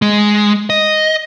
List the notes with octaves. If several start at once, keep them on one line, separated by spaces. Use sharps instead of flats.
G#3
D#5